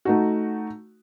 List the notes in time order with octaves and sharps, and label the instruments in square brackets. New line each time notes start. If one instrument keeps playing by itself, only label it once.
[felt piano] A3 D#4 F#4